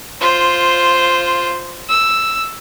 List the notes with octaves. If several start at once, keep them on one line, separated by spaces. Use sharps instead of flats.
F4 C5
E6